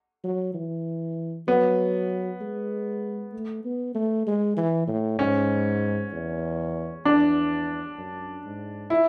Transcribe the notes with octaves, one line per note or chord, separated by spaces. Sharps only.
F#3
E3
F#3 B3
G#3
A3
B3
A3
G#3
E3
A2
G#2 C#4
E2
E2 D4
F#2
G#2
E4